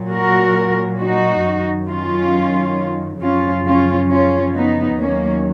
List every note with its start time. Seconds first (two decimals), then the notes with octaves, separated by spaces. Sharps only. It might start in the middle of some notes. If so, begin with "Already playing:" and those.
Already playing: A#2 F#3
0.11 F#4 A#4
1.00 D#4 F#4
1.44 F#2 D#3 F#3
1.88 C#4 F4
3.21 F#2 C#3 F3 C#4 F4
3.66 C#4 F4
4.10 C#4 F4
4.54 B3 D#4
4.98 D#2 D#3 F#3 A#3 C#4